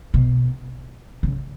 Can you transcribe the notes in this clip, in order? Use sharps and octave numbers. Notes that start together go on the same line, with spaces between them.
B2
C#3